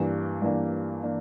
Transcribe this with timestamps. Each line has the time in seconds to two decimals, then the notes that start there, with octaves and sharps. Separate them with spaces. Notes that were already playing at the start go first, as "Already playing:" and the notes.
Already playing: G2 E3 A#3 D4
0.42 G2 E3 A#3 D4
1.03 E3 A#3 D4